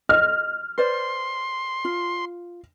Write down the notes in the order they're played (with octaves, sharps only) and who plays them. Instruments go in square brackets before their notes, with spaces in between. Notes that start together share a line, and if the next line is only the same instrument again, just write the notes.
[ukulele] D#5 [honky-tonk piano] F6
[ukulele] B4 C5 D5 [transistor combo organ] C6
[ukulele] F4